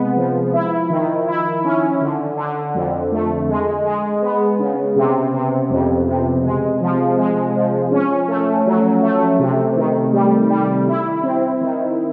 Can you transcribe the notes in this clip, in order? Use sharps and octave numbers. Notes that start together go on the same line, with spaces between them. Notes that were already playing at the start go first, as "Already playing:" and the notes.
Already playing: C3 G#3 B3
F3
E4
D#3
E4
C#4
D3
D3
F2
A3
G#3
G#3
B3
C#3
C3
C3
F2
C3
G#3
F3
G#3
F3
C#4
A3
F#3
A3
C3
D#3
G3
G3
E4
C4
D#3